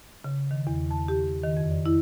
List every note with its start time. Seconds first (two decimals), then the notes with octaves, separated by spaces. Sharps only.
0.24 C#3
0.51 D#3
0.67 E2
0.91 A5
1.08 G4
1.43 D#3
1.57 F2
1.70 D5
1.86 E4